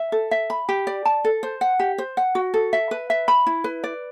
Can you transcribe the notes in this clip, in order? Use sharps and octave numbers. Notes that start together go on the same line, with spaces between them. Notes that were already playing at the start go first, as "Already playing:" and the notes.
Already playing: E5
A4
E5
B5
G4
D5
A5
A4
C5
F#5
G4
C5
F#5
F#4
A4
E5
B4
E5
B5
E4
B4
D5